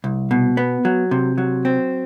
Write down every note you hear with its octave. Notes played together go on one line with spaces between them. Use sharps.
C2
B2
B3
F#3
C3
F#3
C4